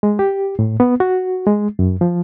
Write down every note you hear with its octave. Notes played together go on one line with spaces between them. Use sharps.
G#3
G4
A2
B3
F#4
G#3
F#2
F3